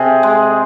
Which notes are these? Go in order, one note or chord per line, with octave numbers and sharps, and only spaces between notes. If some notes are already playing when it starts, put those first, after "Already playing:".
Already playing: C3 G#4
G#3